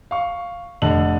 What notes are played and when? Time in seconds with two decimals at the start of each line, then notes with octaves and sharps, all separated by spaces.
0.11 F5 C#6
0.82 F1 D3 D#5 A5 F#7